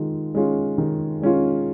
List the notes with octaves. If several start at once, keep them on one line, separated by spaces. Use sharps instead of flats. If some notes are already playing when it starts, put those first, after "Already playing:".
Already playing: D#3 G#3 F4
G#3 C#4 F4
D#3
G#3 C#4 F4